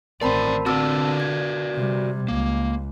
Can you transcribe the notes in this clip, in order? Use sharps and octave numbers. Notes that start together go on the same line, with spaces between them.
A1 D#3 C4 A#4 D5 A5 B5
D3 C4 F#4 A#4 D5 A5 E6
G#6
C3 G3
C#2 A#3